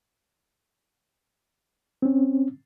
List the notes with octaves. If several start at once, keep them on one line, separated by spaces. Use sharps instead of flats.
C4 C#4